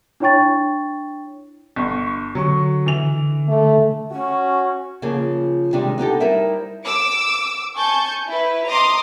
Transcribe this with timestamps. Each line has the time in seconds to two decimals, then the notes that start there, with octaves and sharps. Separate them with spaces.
0.20 D4 E4 C#5 G5 C#6 A6
1.76 G1 C#6
2.35 D3 F#3 C#6
2.86 E3 F7
3.48 A3
4.11 C#4 F#4
5.02 C#3 F3 A#3 F4 G#4
5.73 C3 D#3 G3 G#3 D4
5.98 B3 D#4 G4 A4
6.20 G3 D#4 E4 A#4 C5 E5
6.83 D6 E6 D7
7.76 G#5 A5 C#6 G6
8.28 E4 B4
8.67 D#5 A#5 C6 D6 D#6